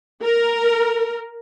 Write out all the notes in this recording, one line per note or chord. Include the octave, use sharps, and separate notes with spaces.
A#4